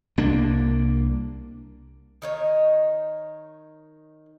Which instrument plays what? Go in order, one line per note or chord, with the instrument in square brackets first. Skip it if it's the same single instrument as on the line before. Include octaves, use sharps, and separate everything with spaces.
[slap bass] C2 A#3 D4
[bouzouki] D#3 D#4 C#5